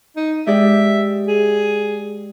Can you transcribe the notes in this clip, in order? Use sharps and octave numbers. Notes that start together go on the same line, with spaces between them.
D#4
G#3 G4 D5 E5
G#4